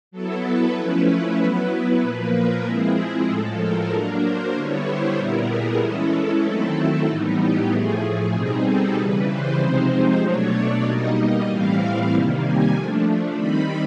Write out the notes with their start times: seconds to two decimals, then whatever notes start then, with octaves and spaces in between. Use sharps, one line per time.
0.11 F#3 B3 E4 A4
0.43 B4
0.75 F3 A3 C#4 E4 B4
1.38 F#3 B3 E4 B4
2.01 A#2 F3 A#3
2.33 A#4
2.64 F3 G#3 C4 E4 G#4
2.96 G#4
3.27 A2 F3 G#3 A4
3.59 A#4
3.90 F#3 A#3 D4
4.22 C5
4.53 D3 G3 B3 E4 C#5
4.85 C5
5.17 A#2 G3 B3 E4 A#4
5.48 G#4
5.80 E3 G#3 C#4 E4 A4
6.12 A4
6.42 D#3 F#3 A3 C4 E4 A4
7.06 A2 E3 G3 B3 D#4
7.38 G4
7.69 A2 F3 A3 G#4
8.00 G#4
8.32 B2 G3 C4 D#4
8.64 A4
8.95 C#3 E3 G3 B4
9.27 C5
9.57 C3 F3 G#3 C4 D#4
10.21 B2 F#3 A3 D4 C#5
10.52 D5
10.84 B2 G3 A#3 D#4 D#5
11.47 A2 E3 G3 C4 E4 F5
12.10 C3 D#3 G3 A#3
12.42 G#5
12.73 F3 A3 D4
13.36 D#3 G3 C4 D#4 B5